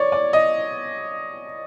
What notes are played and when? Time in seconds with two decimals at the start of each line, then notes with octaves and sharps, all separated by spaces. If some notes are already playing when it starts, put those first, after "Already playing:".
Already playing: C#5 D5
0.12 D5
0.33 D#5